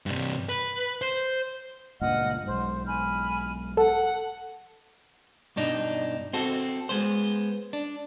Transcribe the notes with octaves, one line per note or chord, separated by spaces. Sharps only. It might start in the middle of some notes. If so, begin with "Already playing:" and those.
G2 C3
B4
C5
C#2 G2 A#2 D#5 F#5 F6
B1 G#2 C5
G#5 B5 F6
A4 F#5
G2 B2 D4 D#4
C4 F#4 A4
G#3 B3 C5
D4